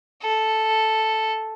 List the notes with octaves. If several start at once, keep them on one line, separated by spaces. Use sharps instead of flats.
A4